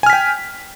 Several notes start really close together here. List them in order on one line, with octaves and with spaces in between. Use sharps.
G#5 F6 B6 G5